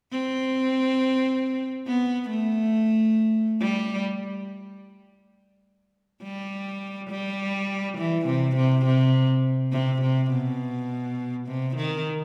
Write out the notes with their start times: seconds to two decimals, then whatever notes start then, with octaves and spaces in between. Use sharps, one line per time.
0.11 C4
1.86 B3
2.30 A3
3.60 G3
6.23 G3
7.10 G3
7.98 E3
8.27 C3
8.56 C3
8.86 C3
9.72 C3
10.02 C3
10.31 B2
11.47 C3
11.76 D#3